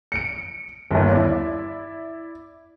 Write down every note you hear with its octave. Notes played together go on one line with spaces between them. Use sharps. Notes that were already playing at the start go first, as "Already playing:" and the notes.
C#7 D7
G1 D#2
E4 D5